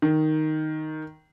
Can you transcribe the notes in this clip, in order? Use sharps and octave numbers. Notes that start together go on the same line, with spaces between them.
D#3